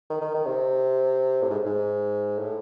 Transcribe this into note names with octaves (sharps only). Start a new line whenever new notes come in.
D#3
D#3
D#3
C3
A2
G#2
G#2
A2